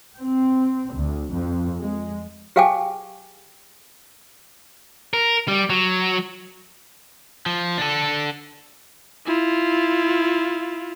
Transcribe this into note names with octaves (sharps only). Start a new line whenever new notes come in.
C4
D2
F2
G#3
G4 G#4 F5 G5 G#5 D6
A#4
G3
F#3
F3
D4 A4
E4 F4